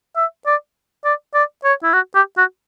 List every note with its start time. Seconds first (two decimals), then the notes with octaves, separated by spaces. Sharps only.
0.16 E5
0.46 D5
1.05 D5
1.34 D5
1.64 C#5
1.83 E4
1.93 F#4
2.15 G4
2.37 F#4